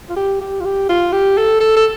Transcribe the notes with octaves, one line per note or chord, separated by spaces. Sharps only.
F4
G4
G4
F4
G4
F4
G4
A4
A4
A4